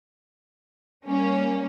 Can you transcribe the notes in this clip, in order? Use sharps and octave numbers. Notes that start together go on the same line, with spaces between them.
G3 A#3 C#4